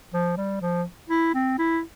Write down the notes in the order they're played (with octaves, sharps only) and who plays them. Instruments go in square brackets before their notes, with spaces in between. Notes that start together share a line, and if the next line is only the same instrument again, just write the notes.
[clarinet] F3
G3
F3
E4
C4
E4